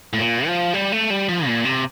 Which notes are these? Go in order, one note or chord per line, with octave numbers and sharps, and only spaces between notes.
A2
A#2
F3
G3
A3
G3
F3
A#2
C3